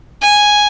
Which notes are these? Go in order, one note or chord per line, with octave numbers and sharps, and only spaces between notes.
G#5